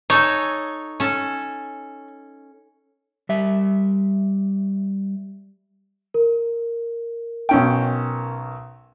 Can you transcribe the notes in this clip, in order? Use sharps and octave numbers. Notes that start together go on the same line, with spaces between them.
D#4 A4 C#5 G#5
C#4 A4
G3 E5
A#4
B1 C#4 G5